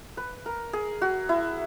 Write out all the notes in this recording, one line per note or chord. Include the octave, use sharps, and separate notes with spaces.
B4
A#4
G#4
F#4
E4